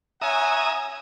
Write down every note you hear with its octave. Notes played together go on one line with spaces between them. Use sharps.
C#5 E5 F#5 G#5 A#5 D#6